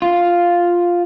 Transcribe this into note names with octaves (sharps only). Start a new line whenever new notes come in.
F4